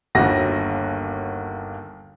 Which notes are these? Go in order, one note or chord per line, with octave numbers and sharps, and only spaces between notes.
G1 D#2 F#4 A#6